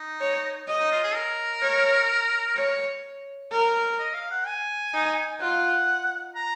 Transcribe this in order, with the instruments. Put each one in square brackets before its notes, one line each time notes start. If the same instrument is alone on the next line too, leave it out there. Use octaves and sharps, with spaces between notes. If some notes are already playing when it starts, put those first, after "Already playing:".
Already playing: [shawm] D#4
[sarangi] C#5
D#5
[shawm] D#4
F4
G#4
A#4
[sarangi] C#5
C#5
A#4
[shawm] D#5
F5
F#5
G#5
[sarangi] D#4
[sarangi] F4 [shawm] F#5
[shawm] A#5